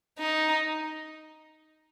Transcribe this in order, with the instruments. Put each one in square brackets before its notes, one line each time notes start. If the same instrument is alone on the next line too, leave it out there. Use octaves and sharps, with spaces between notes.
[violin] D#4